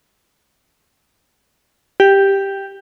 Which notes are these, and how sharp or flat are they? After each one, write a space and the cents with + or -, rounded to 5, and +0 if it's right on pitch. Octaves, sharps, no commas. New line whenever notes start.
G4 +0